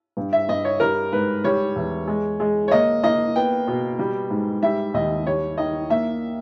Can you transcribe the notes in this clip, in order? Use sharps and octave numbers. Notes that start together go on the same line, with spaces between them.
G2
E5
G2 D#5
C#5
G3 A#4
G#2 B4
G3 C#5
E2
G#3
G#3
C#5
A#3 D#5
A#3 D#5
B3 G5
B2
G3
G#2
G3 E5
D#2 D#5
G3 C#5
D#3 D#5
A#3 E5